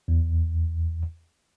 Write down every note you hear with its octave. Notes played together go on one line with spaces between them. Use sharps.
E2